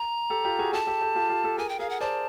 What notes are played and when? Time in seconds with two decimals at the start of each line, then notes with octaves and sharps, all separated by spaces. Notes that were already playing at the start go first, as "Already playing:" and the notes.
Already playing: A#5
0.30 G4 A4
0.45 F4 G4
0.59 F#4 G#4
0.73 G4 A4 A5
0.87 G4 A4
1.01 G4 A4
1.15 F4 G4
1.29 F4 G4
1.44 G4 A4
1.58 G#4 A#4 G#5
1.69 G5
1.79 G#4 A#4 F5
1.90 F#5
2.00 C5 D5 A5